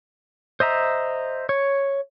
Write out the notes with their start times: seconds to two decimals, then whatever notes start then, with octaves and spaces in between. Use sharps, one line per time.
0.60 C5 D#5 E5 A#5
1.49 C#5